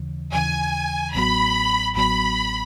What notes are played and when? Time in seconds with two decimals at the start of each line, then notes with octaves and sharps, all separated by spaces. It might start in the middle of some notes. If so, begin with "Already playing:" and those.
Already playing: D#2 C#3 E3
0.32 D#2 C#3 E3 G#5
1.14 A1 A2 F#3 B3 F#4 B5
1.96 A1 A2 F#3 B3 F#4 B5